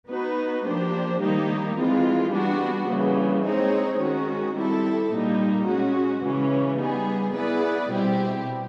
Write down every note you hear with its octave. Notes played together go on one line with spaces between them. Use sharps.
B3 D#4 F#4 B4
F3 A#3 D4 G4 C5
D#3 G3 A#3 D#4 G4
E3 G#3 C4 F4
G3 B3 D4 F#4
C#3 E3 G3 A#3
G#3 C4 D#4 G#4 C#5
D#3 G#3 C#4 F#4
G3 C4 E4 A4
A#2 G3 A#3 D#4
G#3 C#4 F#4
C#3 E3 G#3 C#4
G3 B3 D#4 G#4
B3 E4 G#4 B4 D5
B2 G3 C4 E4 G4